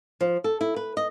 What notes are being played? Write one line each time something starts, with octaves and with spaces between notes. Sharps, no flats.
F3
A4
E4
B4
D#5